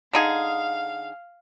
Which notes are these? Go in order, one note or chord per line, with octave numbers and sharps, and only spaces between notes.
D3 D#4 G#4 F5